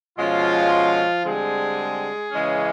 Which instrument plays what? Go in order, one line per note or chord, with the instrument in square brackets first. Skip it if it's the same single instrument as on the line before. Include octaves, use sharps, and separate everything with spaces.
[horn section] B2 F3 G#3 C#4 F4
D3 G3 G#3 C4 G#4
C#3 E3 G#3 C#4